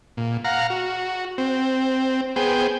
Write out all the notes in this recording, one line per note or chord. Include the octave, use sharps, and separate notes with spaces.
A#2
F5 F#5 A#5
F#4
C4
B3 G#4 C5 G5